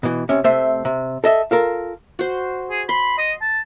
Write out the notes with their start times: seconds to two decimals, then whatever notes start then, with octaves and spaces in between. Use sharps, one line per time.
0.03 B2 E3
0.29 C3 C#4
0.44 C3 A3 C5 E5
0.85 C3
1.24 A4 D#5 E5
1.51 F4 A4 A#4
2.19 F#4 C5
2.71 G#4
2.89 B5 C6
3.18 D#5
3.41 A5